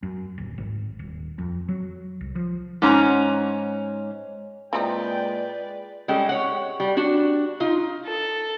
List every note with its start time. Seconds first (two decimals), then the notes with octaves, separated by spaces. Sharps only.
0.03 F#2
0.38 D1
0.58 G#1
0.99 D#1
1.38 F2
1.68 F#3
2.21 C2
2.35 F3
2.82 G#2 C#4 A#5
4.73 A#2 E3 G#3 C4 D#4 B4 D5 G5
6.08 G3 G#3 C#4 A4 G5
6.29 C#5 F#5
6.80 G3
6.97 D4 F#4
7.60 D#4 F4
8.05 A4